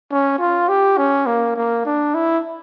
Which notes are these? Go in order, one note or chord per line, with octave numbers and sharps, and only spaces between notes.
C#4
F4
G4
C#4
A#3
A#3
D4
E4